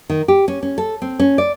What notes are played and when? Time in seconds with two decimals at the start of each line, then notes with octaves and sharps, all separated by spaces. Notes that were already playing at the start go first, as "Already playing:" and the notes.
0.10 D#3
0.28 G4
0.48 C#4
0.63 C#4
0.78 A4
1.02 C4
1.20 C#4
1.38 D5